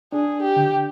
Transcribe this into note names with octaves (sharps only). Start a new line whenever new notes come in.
D4 G#4
G4
D3